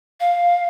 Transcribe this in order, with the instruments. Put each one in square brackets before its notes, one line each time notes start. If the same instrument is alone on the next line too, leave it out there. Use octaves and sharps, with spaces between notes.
[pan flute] F5